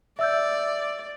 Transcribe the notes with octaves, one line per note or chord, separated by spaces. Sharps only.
D5 E5 E6 G6